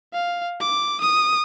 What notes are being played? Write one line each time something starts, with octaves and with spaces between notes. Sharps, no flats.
F5
D6
D#6